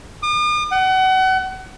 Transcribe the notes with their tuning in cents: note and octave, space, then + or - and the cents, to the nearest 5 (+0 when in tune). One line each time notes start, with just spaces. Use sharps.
D#6 -45
F#5 +30